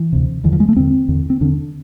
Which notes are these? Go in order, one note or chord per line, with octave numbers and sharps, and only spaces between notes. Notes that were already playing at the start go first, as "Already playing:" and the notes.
Already playing: E3
D2 C3
E2 D3 E3
F3
G#3
A3
E2 D3 C4
E2 D3
C4
E2 D3 D4